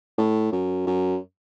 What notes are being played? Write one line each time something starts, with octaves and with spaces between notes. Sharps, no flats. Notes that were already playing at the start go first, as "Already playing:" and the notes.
A2
F#2
F#2